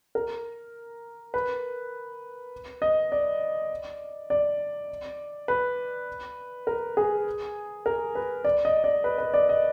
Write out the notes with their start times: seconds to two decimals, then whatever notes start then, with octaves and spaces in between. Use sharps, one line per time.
0.15 A#4
1.34 B4
2.82 D#5
3.12 D5
4.30 D5
5.48 B4
6.67 A#4
6.97 G#4
7.86 A#4
8.15 B4
8.45 D5
8.65 D#5
8.84 D5
9.04 B4
9.18 B4
9.34 D5
9.49 D#5